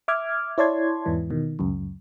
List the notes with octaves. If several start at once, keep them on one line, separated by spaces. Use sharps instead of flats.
E5 D6 F6 G#6
E4 C#5 D5 A5 C6 G#6
E2 G#2 E3
B2 D#3
C#2 F#2